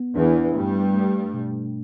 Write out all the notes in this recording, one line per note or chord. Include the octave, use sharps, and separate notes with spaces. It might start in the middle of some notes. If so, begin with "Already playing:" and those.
Already playing: B3
E2 E3 D4
G2 G3 A3
A3
B2